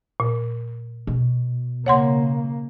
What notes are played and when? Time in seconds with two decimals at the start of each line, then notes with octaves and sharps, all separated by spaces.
0.20 A#2
1.07 B2
1.86 C#3 A#3 C#5 F#5 C6